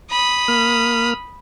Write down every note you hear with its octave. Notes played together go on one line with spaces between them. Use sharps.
B5 D#6
A#3 F6